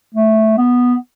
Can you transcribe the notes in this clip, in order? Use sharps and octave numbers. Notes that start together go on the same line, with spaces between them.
A3
B3